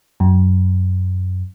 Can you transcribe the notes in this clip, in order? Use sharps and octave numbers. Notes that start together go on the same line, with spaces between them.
F#2